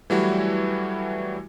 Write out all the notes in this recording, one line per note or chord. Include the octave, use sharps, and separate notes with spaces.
E3 F#3 G3 A3 E4 F#4